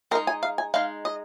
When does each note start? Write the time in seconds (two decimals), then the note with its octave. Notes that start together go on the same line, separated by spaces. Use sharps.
0.11 G#3 A#4
0.15 D#4
0.27 G#5
0.43 F5
0.58 G#5
0.74 G#3 D#4 F5
1.05 D#5